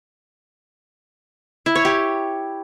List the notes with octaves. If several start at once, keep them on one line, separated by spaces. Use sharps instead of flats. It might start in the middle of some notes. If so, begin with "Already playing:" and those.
E4
C#5
G4